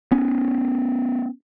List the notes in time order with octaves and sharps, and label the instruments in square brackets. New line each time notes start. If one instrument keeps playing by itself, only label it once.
[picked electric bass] B3 C#4